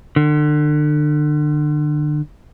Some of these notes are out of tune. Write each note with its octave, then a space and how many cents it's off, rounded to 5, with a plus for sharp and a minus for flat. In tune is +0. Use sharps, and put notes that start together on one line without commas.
D3 +35